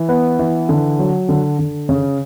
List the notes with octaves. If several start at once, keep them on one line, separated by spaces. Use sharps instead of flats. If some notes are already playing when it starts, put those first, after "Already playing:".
Already playing: E3
B3
E3
D3
F#3
D3
D3
C#3